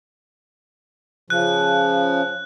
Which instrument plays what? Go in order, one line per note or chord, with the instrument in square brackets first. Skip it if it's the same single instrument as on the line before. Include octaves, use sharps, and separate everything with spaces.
[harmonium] C#3 F3 [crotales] F#6